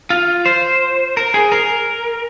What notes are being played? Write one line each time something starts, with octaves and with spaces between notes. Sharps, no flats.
F4
C5
A#4
G#4
A#4